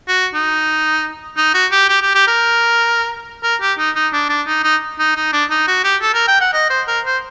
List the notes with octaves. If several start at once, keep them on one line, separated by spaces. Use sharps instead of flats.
F#4
D#4
D#4
F#4
G4
G4
G4
G4
A#4
A#4
G4
D#4
D#4
D4
D4
D#4
D#4
D#4
D#4
D4
D#4
F#4
G4
A4
A#4
G5
F#5
D#5
C5
A#4
C5